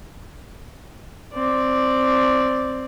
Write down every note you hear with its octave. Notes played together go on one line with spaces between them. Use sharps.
C4 D5